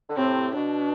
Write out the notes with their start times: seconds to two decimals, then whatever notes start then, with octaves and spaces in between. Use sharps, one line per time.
0.10 D3
0.17 A2 C3 C4
0.51 C3
0.55 B2 D4